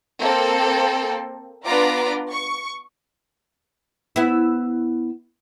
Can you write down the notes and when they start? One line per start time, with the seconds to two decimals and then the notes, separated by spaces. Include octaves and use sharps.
0.22 A#3 C4 A4
1.65 B3 D4 F4 B4 A#5 D6
2.32 C#6
4.16 B3 E4